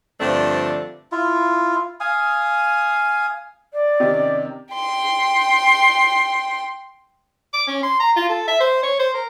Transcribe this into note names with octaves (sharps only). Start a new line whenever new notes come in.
G2 D3 F3 A3 C4 D4
E4 F4
F5 G#5 D#6
D5
C3 D#3 C#4
G5 C6
D6
C#4
C6
A#5
F4
A4
E5
C5
C#5
C5
A#4